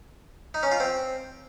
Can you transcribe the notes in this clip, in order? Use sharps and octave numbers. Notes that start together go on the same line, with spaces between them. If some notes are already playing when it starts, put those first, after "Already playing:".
D#4
C#4
F4
C4